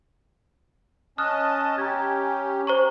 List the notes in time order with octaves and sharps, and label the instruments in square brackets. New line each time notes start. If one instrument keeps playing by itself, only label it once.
[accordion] C#4 D#5 A5 [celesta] D#6 F#6 [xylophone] F6
[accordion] C#4 G4 [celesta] A#5 G#6
[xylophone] C5 A#5 C#6